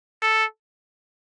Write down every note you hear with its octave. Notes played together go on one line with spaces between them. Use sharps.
A4